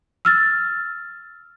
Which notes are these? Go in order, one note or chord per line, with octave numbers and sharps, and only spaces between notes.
E6 F6 A6